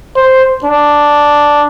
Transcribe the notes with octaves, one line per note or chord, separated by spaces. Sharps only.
C5
D4